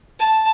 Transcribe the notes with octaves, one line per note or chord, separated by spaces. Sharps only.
A5